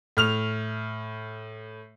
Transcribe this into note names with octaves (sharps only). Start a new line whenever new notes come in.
A2 F6 F7